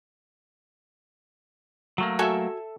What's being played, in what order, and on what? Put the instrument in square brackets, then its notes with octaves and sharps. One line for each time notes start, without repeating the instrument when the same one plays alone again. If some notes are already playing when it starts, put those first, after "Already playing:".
[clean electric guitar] F#3 A3 A#3
[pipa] F#4 C#5 G#5 [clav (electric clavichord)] A4 E5